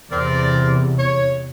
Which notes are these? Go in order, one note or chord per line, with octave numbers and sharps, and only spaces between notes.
E2 C3 C4 A#4 D5
C#5